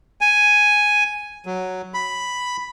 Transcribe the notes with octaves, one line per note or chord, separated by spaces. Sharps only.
G#5
F#3
B5